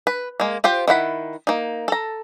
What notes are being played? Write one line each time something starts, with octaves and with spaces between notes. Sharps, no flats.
B4
G#3 A#3
F4 G4 C5 G5
D#3 E4 F#5 B5
A#3 D#4
A4 A#5